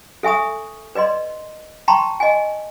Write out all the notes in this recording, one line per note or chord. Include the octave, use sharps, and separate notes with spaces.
A4 E5 G#5 C#6 D#6
B4 D5 D#5 C6
G5 A5 A#5 C6 C#6
D#5 G#5